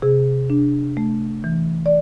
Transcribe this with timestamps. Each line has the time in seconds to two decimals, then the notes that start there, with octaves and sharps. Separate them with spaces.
0.02 C3 G#4
0.50 D4
0.97 A3
1.44 E3
1.86 D5